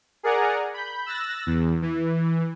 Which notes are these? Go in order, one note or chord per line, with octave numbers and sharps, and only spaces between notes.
G#4 A#4 D5 F#5 G#5 A#5
B5 G6
E6 F#6 A6 A#6
E2
E3